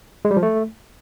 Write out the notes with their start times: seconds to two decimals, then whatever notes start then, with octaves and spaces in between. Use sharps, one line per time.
0.25 G#3
0.31 G3
0.37 F3
0.43 A3